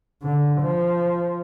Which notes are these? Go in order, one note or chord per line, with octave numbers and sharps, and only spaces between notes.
D3
F3